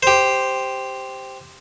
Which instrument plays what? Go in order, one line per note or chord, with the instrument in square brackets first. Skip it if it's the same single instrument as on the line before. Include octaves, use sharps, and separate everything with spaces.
[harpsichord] G4 C5